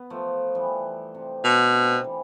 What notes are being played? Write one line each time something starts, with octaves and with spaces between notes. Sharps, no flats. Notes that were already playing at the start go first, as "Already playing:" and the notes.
Already playing: B3
F3 A3
E3 G3
C3
B2 D3
C3
E3 G3